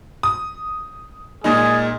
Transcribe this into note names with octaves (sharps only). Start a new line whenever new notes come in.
D#6
A#2 G#3 D#4 G#4